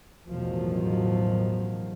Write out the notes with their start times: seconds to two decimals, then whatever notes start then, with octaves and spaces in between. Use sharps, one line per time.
0.27 A1 E2 B2 D#3 F3 F#3